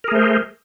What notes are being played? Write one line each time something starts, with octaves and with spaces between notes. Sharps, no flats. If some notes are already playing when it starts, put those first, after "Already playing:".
A3 G#4 A#4 C5